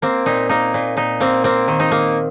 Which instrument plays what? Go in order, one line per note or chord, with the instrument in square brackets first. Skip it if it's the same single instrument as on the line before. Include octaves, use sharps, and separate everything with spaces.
[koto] A#3 C4
A#2 D#4
A#3 D#4
A#2
A#2 D#4
A#3 C4
A#3 C4
D#3
D#4
A#3